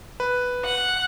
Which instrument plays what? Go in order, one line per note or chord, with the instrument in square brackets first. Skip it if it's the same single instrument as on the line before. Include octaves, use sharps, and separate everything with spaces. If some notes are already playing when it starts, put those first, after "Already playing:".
[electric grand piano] B4
[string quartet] F#5